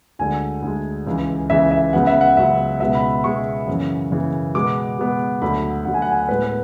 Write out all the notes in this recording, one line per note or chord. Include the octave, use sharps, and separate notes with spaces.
D2 D3 G#3 G#5
D2 D3 G#3
C#2 C#3 E3
C#2 C#3 E3 E5
E5
C#2 C#3 F#3 B3 F#5
E5
F#5
C#2 C#3 F#3 B3 E5
C#2 B2 G#3 B3 E5
B5
B5
C#2 B2 G#3 B3 C#6
F#2 C#3 E3
F#2 C#3 E3
B2 G#3 B3 D6
B2 G#3 B3
D2 D3 F#3 A3 B5
D2 D3 F#3 A3 F#5
G#5
F#5
G#5
F#5
A2 G#3 B3 B4
B4